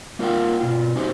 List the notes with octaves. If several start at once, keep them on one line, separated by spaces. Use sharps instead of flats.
A#3 F4 A#4 F#5 G5
B2 F4
C#4 D#4 F#4 G4 C5